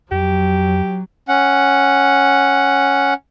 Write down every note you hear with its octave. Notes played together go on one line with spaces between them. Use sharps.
F2 F#3 G4
C#4 F#5